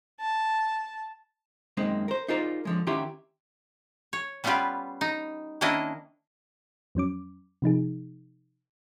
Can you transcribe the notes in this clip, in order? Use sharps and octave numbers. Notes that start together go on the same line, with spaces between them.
A5
F#2 D#3 G#3 A#3 C4
A#4 C5
D#4 F4 G#4 A#4 C5 D5
D3 F3 G#3
D#3 C#4 E4 G4 F#5 C6
C#5
G3 B3 C#4 F4 G4 B4
D#4
D#3 A#3 C#4 D4 E4 D#5
F2 F#3 C#4 D6
C3 F3 D#4 G#4